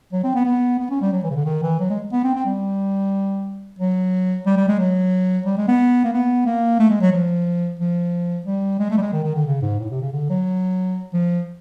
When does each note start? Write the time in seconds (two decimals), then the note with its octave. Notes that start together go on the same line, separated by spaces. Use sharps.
0.13 F#3
0.24 C4
0.35 B3
0.45 B3
0.79 B3
0.90 C#4
1.01 G3
1.12 F#3
1.23 E3
1.30 C#3
1.35 D3
1.45 D#3
1.63 E3
1.80 F#3
1.90 G#3
2.12 B3
2.24 C4
2.35 C4
2.46 G3
3.79 F#3
4.46 G3
4.57 G3
4.68 G#3
4.79 F#3
5.46 G3
5.57 G#3
5.68 B3
6.04 A#3
6.13 B3
6.46 A#3
6.79 A3
6.90 G#3
7.01 F#3
7.12 F3
7.79 F3
8.46 G3
8.79 G#3
8.90 A3
8.98 G3
9.01 G#3
9.13 D#3
9.24 D#3
9.35 D3
9.46 C#3
9.62 G#2
9.79 A2
9.91 C3
10.02 C#3
10.13 D3
10.30 F#3
11.13 F3